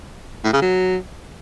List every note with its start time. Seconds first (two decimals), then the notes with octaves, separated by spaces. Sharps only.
0.44 A2
0.53 C#3
0.62 F#3